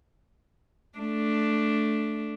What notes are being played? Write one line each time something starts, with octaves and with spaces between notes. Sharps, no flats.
A3 D4